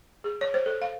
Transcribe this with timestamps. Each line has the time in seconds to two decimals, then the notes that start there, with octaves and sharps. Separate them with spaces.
0.24 G#4
0.41 C#5
0.54 C5
0.66 A4
0.82 F5